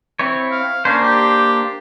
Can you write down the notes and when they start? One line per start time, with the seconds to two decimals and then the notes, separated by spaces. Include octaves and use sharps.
0.19 C4 E4 C#5
0.52 F5
0.85 A#3 C#4 D4 C5
1.03 G4